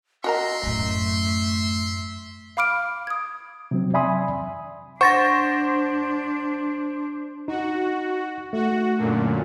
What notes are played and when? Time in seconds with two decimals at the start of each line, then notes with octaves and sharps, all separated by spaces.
0.24 F#4 A#4 D#5 E5 A#5 C6
0.63 F#2 A2 A3
2.57 F5 B5 D6 F6 D7
3.07 D#6 G#6
3.71 C3 F#3 C4
3.94 D5 E5 G#5 B5 C6 D#6
5.01 D4 C5 F#5 C#6 A6 A#6
7.48 D#4 F#4
8.53 A3 F#4
8.97 F#2 A#2 D3